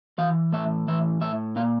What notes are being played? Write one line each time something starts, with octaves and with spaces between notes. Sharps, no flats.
E3 F5
A2 E5
E3 E5
A2 E5
A#2 F5